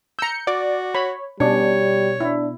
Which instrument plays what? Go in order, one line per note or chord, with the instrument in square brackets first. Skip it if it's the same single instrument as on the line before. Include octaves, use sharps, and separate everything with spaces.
[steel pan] A#5 E6 [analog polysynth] G6 C#7
[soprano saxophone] F#4 [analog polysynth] D5
[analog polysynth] C#5 [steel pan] B5
[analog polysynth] B2 [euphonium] G3 [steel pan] C#4 D4 [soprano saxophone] C#5
[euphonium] D4 [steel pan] E4